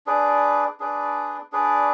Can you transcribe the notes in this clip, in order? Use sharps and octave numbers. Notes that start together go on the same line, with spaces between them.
D4 G#4 B4 D5
D4 G#4 B4 D5
D4 G#4 B4 D5